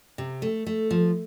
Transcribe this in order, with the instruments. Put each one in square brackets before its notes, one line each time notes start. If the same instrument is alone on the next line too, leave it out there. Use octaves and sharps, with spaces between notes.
[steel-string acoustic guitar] C3
A3
A3
F3